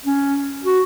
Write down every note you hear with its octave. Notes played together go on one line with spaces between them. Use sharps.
C#4
F#4